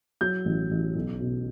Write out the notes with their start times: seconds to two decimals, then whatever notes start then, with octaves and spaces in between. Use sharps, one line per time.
0.21 F#3 G6
0.45 A1
0.71 A1
0.95 B1
1.21 B2